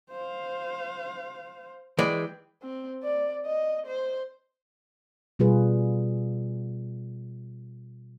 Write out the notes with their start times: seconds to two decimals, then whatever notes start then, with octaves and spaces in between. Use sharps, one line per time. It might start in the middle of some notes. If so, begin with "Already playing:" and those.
0.10 C5 F5
1.99 E3 G#3 D5 G5
2.63 C4
3.03 D5
3.45 D#5
3.87 C5
5.39 B2 G3 F4 G#4 B4